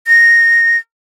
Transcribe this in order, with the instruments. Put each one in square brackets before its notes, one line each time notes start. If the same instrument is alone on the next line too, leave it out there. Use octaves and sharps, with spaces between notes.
[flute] A#6